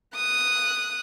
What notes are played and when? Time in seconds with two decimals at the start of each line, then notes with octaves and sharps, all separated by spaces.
0.16 D#6 F#6